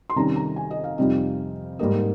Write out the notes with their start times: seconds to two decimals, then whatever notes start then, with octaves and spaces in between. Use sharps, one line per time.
0.10 C6
0.16 C3 D#3 G3 C#4 A#5
0.36 A#5
0.56 G#5
0.71 D#5
0.84 F5
0.98 F2 C3 G3 C4 D#4
1.79 G#2 G3 A#3 D#4 D#5